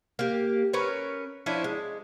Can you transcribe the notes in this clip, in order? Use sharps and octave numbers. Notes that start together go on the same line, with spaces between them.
A#3 G4
C#4 A#4 B4 C#5
F3 C#4 D4 E4
G#3